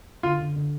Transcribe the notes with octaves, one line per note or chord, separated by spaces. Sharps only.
D3 F4
D3
D3